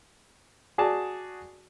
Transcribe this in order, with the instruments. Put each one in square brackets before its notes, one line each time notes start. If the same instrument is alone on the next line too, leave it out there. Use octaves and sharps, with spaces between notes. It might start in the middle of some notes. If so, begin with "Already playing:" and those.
[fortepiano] F#4 G#4 D5 A5